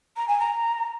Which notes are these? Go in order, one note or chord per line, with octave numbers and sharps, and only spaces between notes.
A#5
G#5
A#5